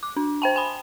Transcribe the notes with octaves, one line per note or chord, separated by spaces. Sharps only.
D6
D4
C5 G5 A5
G#5 B5